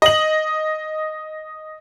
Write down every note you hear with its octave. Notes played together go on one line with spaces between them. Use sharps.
D#5 F#7